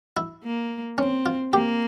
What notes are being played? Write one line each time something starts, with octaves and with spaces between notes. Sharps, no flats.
E4
A#3
C4 C#4
F4
A#3 G4